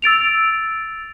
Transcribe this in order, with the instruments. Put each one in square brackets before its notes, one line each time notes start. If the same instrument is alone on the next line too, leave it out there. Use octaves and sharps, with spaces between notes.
[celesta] E6 A6 D7 F7